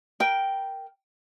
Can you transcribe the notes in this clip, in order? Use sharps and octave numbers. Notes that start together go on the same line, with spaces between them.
A#4 G5